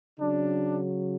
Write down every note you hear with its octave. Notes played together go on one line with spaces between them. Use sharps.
C#3 F#3 D4